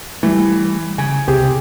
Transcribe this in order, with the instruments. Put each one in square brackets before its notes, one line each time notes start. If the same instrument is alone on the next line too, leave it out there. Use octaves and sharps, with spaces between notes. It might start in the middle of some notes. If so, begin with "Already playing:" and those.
[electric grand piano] E3 [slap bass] G3 A3
[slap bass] C#3 [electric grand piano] G#5
[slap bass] C2 [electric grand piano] C4 G4 G#4